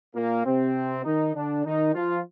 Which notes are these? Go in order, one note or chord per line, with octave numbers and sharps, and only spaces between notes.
A#2 A#3
C3 C4
D#3 D#4
D3 D4
D#3 D#4
F3 F4